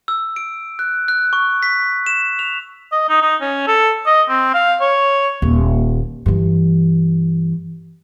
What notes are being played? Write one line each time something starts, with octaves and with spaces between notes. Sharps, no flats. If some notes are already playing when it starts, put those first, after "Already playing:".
E6
D7
F#6
F#6
C#6
B6
E7
F7
D#5
D#4
D#4
C#4
A4
D#5
C4
F5
C#5
D#1
G2 E3